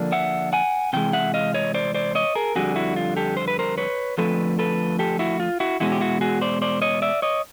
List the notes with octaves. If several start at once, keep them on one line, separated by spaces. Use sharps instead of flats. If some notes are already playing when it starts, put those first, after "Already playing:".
Already playing: D3 F3 A#3 D4
E5 F#5
F#5 G#5
C3 E3 G#3 G5
E5 F#5
D#5 F5
C#5 D#5
C5 D5
C5 D5
C#5 D#5
G#4 A#4
F2 D3 G3 F#4 G#4
E4 F#4
F4
G4 A4
C5
B4
A#4 C5
B4 C#5
F2 D3 F3 A3 A4 B4
A4 B4
G4 A4
E4 F#4
F4
E4 F#4
E2 B2 G#3 C#4 E4 F#4
G4
E4 F#4
F#4 G#4
C5 D5
C5 D5
C#5 D#5
D5 E5
C#5 D#5